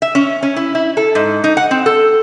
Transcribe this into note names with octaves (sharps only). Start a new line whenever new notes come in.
E5
C#4
C#4
E4
E4
A4
G#2
D#4
F#5
C4
A4